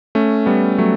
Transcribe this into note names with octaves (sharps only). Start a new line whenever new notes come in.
A3 C#4
G3 B3
F#3 A3